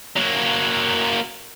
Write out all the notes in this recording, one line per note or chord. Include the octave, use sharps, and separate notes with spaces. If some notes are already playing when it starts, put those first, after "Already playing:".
F#3 A#3